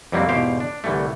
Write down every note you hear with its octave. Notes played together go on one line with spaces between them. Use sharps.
F2 C3 F#3 G3 A#3 C4
E2 G#2 B2 G4 C5 F5
D4
C2 D3 E3 G3 A3